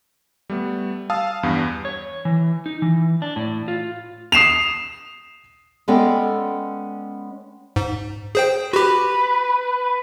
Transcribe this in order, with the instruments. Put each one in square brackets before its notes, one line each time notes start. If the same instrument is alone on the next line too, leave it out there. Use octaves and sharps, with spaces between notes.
[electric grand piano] G3 A3 B3
F5 A5 D#6 E6
E2 G2 B3
[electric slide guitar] C#5
E3
D#4
E3
D4
A2
F4
[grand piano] D#6 C7 E7 F7
[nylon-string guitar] G#3 B3 C#4 A4 D5 G5
[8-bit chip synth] G#2
G#4 C5 G5
[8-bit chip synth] F#4 G4 [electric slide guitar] B4